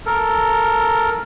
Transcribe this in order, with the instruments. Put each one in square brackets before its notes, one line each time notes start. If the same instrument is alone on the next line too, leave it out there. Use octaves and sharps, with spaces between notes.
[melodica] A4 A#4